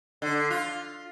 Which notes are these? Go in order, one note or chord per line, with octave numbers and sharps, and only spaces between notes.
D3
F4